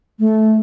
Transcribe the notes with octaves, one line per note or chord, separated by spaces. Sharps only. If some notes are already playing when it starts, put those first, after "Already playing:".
A3